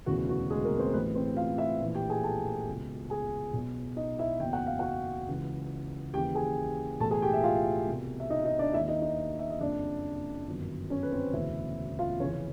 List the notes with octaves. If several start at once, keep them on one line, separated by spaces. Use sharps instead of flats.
E1 D2 C#3 E3 F#4
F#4
G#3 G#4
A#3 A#4
C4 C5
A1 A2 E3 B3 B4
C4 C5
F4 F5
E4 E5
A#1 A2 E3
G4 G5
G#4 G#5
A4 A5
C#2 B2
G#4 G#5
B1 B2
D#4 D#5
E4 E5
F#1 E2 B2 G5
F#5
F5
F#4 F#5
C#2 C#3 E3
D#2 C#3 E3 G4 G5
G#4 G#5
B1 A2 E3 A4 A5
G#4 G#5
G4 G5
E5
F4 F5
C2 B2
E5
D#4 D#5
D#4 D#5
D4 D5
D#2 D#3 E4 E5
D#4 D#5
D#4 D#5
E5
D#5
F#1 F2 C#3 D4 D5
G1 F#2 D#3
C#4 C#5
B4
C4 C5
E1 D2 C#3 E3 E4 E5
F4 F5
F1 F2 C#3 E3 C#4 C#5